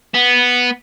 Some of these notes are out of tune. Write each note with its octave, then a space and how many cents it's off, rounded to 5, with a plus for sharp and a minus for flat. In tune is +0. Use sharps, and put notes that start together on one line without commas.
B3 -5